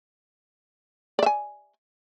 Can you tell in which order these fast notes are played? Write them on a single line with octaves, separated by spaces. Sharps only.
D5 E5 G#5